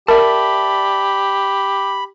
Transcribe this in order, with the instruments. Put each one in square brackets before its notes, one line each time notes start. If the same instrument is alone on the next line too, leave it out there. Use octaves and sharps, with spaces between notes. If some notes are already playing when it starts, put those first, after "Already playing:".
[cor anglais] G4 [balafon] A#4 [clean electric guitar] D5 E5 A5 [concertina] B5